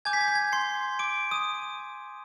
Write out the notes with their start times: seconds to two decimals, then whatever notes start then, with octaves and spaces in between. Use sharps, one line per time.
0.05 G#5 D6 G6 G#6
0.13 B6
0.21 G#6
0.28 B6
0.35 G#6
0.53 C6 C7
0.99 D6 D7
1.31 D#6 D#7